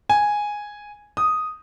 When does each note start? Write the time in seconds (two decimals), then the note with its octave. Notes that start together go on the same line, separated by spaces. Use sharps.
0.09 G#5
1.17 D#6